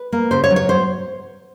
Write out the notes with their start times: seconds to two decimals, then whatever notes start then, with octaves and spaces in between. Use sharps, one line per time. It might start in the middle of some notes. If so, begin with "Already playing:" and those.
Already playing: B4
0.12 A#3
0.31 C#3 C5
0.44 C#5
0.50 F#3
0.56 C#5
0.69 C5